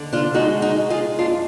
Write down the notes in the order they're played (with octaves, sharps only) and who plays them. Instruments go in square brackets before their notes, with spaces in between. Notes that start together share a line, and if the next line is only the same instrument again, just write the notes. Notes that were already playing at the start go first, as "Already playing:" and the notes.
Already playing: [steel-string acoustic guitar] D#2 D3
D4 F4
G#3 D#4 F#4
D#4 F#4
G#3
F4 G#4
F#2 D4 F4